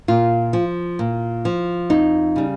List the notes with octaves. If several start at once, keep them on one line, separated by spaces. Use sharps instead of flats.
A#2 F4
F3
A#2
F3
F2 D#4
C#3 G3